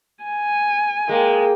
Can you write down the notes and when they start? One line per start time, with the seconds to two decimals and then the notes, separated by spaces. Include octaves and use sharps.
0.24 G#5
1.09 G#3 A#3 G5